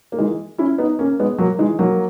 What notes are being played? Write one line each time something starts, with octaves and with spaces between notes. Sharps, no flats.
A#3
E3 G#3
C#4 E4
B3 D#4
A#3 C#4
G#3 B3
F#3 A#3
E3 G#3
F#3 A#3